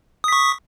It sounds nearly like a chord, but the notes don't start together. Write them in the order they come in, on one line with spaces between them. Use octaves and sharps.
D#6 B6 C#6